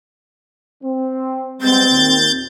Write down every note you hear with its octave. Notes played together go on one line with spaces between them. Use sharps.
C4
G3 G#3 B3 C4 G6 A6
D#2 A#2